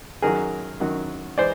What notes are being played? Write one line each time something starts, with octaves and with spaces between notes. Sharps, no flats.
F#2 D#3 F#3 G#4 A#4
F#2 D#3 F#3
E3 G#3 C5 D5